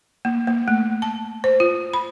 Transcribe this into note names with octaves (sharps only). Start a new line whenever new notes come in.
A#3
A#3
A3
A5
C5
F4
B5